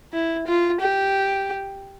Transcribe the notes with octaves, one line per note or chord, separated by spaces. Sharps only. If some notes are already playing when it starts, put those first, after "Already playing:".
E4
F4
G4